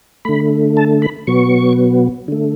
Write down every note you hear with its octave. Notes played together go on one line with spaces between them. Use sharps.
D3 A3 B5
A5
B5
B2 F#3 B3 C#6
D3 A3